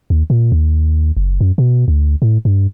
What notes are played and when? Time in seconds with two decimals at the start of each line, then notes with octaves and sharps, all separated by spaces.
0.10 D#2
0.30 A#2
0.52 D#2
1.17 F#1
1.41 F#2
1.58 B2
1.88 D2
2.22 A2
2.45 G2